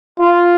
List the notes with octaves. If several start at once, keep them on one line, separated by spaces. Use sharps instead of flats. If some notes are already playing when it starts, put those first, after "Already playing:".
F4